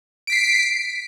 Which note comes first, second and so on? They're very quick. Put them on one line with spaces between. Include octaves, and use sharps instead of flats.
D7 B6 C7